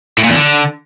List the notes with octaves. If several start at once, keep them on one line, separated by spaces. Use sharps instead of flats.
A2
A#2
E2
D3